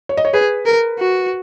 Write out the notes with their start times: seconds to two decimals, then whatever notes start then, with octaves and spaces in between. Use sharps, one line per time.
0.09 C#5
0.17 D#5
0.25 C#5
0.34 G#4 B4
0.66 A#4
0.99 F#4